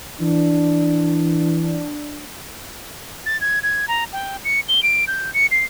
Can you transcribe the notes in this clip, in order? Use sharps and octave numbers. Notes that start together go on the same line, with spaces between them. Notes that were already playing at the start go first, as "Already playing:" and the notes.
E3 D4
A6
G#6
G#6
A#5
G5
C#7
G7
D7
G6
C#7
C7